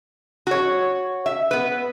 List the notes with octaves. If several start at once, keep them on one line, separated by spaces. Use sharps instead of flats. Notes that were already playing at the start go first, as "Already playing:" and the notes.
F#4 C#5
E5
B3 B4